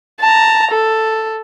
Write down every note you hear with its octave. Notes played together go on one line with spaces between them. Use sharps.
A5 A#5
A4